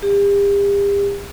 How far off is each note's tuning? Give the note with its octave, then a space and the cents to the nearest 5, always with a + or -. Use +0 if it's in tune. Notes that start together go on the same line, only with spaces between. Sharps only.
G4 +40